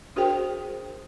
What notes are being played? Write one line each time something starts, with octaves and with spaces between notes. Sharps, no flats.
D4 F#4 G#4 A#4 C5 G5